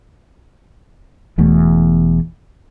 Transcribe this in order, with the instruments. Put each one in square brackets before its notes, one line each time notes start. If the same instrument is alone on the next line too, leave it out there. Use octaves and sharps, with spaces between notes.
[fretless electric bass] E1 E2 B2 A3